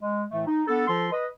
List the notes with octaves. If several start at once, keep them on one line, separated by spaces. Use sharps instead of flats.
G#3
A2 E3 A3
D#4
B3 D4 A4
F3 F4 A4 C6
B4 D#5